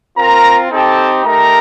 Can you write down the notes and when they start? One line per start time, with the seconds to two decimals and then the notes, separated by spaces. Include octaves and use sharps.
0.16 C4 F4 A#4 A#5
0.70 C4 D#4 G4 A4 A5
1.24 A3 D#4 G4 A#4 A#5